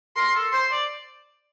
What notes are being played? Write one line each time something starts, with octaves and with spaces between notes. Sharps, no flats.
A#4 C6
A4
C5 C6
D5